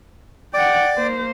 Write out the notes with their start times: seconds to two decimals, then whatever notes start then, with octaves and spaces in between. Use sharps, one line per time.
0.54 D5 F#5 G5 D6
0.96 A#3 C5